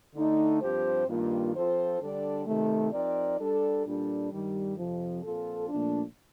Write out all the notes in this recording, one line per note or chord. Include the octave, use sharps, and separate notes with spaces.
D3 A3 D#4
G2 F3 C4 G4 C5
G2 D#3 A#3 F4
F3 C4 F4 A4 C5
D3 G3 D4 A4 D5
C3 D#3 A3
F3 C4 D#4 A#4 D5
G3 D4 A4 D5
A#2 G3 D4 A4
G2 D#3 G3
F2 C3 F3
A#2 F3 C4 F4 A4
A#2 F3 A3 D4